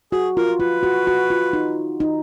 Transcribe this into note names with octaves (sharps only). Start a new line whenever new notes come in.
F#4 G#4
F4 A#4
F4 B4
F#4
F#4
F4
D#4
D#4